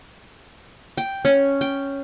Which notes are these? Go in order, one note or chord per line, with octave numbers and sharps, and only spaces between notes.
G5
C#4
G5